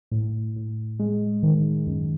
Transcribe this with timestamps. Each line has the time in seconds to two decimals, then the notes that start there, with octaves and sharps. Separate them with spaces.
0.11 A2
0.56 A2
0.99 G#3
1.43 D#3
1.87 F#2